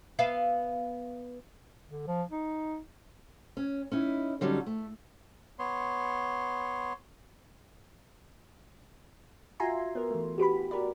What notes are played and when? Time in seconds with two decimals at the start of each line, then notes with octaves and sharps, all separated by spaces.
0.19 B3 E5 F5
1.89 D3
2.07 F3
2.30 D#4
3.57 C#4
3.92 C#4 D#4 E4
4.41 D3 F#3 G3 C#4 D#4
4.66 A3
5.59 B3 C#5 C6
9.60 F4 F#4 E5 G#5 A#5 C6
9.95 B3 A#4
10.11 E3 A3
10.38 F#4 G4 B4 B5
10.71 F#4 G4 A#4 B4 D5